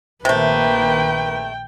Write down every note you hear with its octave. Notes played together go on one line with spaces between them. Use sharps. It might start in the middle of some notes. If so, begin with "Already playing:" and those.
A#1 C3 D#3 A3 A#3 B4 G5